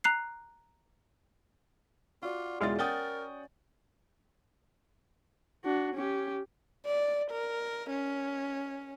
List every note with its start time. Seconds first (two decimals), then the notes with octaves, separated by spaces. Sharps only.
0.04 A#5 F#6 C7
2.22 F4 F#4 D5 F#5
2.60 E1 C#3 G#3 E4 F4 A6
2.79 C#4 A#4 F#5 G5 D#6 G6 A6
5.64 D4 F#4
5.95 C#4 G4
6.86 D5
7.31 A#4
7.90 C#4